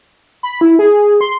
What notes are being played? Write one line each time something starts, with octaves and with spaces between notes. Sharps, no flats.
B5
E4
G#4
C6